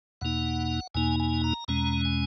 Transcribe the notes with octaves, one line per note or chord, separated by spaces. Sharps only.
E2 B2 A#3 D#4 F#5
E2 B2 A#3 D#4 G#5
G#5
A#5
E2 B2 G#3 C#4 A#5
G#5